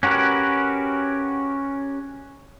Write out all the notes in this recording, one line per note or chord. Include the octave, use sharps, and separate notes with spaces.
C#4 F#4 G4 A#4 B4